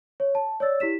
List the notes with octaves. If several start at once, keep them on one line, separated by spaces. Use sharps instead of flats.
C#5
A5
C#5 D5 E6 A6
E4 G4 B6 E7